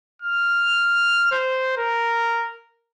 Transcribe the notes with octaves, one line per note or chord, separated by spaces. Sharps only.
F6
C5
A#4